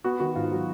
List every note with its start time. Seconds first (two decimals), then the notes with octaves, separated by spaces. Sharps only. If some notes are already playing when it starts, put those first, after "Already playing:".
0.04 B3 F#4
0.20 D#3 F#4
0.35 G#2 F4
0.52 F#3